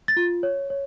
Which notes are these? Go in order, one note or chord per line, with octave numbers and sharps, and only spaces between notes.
A6
F4
C#5
C#5